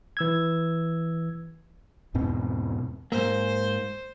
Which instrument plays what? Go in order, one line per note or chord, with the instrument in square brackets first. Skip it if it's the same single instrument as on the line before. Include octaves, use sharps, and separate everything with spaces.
[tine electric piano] E3 E6 G#6
[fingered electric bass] E2 G#2 B2 C4
[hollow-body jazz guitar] G#2 A#3 [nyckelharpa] C5